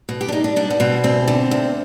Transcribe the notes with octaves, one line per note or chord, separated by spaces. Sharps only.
B2
G4
D4
B2 D#4
D4
G3 D4
B3
B2 C4
D2 C4
D3
D2